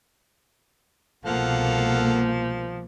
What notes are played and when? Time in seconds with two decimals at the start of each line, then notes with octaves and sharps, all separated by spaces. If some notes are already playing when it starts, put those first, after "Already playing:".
1.26 C2 B2 F3 A#3 A4 F5 F#5